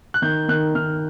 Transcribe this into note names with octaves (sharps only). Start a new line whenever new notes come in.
F#6
D#3 G6
D#3 F#6
D#3 F6